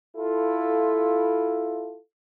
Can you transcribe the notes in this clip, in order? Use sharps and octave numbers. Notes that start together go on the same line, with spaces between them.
E4 F4 A4